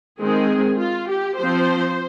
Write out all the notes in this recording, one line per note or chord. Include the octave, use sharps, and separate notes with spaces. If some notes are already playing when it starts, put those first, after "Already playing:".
D#3 G#3 C4 G#4
F4
G4
F3 C4 C5